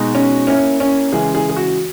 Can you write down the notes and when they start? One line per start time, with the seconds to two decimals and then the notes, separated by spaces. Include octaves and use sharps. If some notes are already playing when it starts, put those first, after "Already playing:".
Already playing: B2 G#3 D#4 F#4
0.15 C#4
0.47 A#3 C#4 E4 A#4 C#5
0.80 C#4
1.13 C#3 E3 G#3 G#4
1.35 G#4
1.49 G#4
1.57 F#4